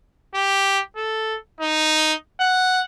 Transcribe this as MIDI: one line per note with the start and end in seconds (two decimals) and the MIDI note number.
0.35 0.80 67
0.96 1.36 69
1.61 2.13 63
2.40 2.83 78